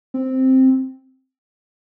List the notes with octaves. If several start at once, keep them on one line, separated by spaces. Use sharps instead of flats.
C4